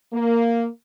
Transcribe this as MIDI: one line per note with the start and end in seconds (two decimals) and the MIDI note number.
0.12 0.68 58